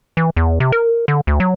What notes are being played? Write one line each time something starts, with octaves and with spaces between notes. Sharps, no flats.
E3
E2
C3
A#4
D3
D2
F#3